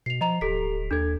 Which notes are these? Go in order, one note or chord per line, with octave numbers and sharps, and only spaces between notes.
B2 C7 F7
F3 D#5 A#5 F7
D1 G4 A4 B6
D#2 D4 A4 G#6